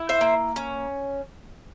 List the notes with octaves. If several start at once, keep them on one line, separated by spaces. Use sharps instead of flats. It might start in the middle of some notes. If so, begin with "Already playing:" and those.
Already playing: E4
C5 E5
A#3
C#4